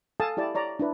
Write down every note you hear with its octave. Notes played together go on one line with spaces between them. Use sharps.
A4 F5 G#5 A5 D#6
E4 G4 D5 A5
C#5 D5 A#5
D4 E4 B4